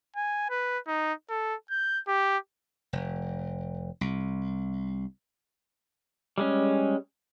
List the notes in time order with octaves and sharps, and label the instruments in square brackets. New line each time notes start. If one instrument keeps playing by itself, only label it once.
[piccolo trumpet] G#5
B4
D#4
A4
G6
G4
[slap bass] F1
C2
[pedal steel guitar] G3 G#3 C#4